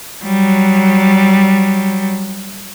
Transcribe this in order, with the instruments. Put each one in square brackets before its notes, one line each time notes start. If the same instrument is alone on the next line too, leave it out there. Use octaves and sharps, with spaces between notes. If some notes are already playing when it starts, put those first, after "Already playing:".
[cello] F#3 G3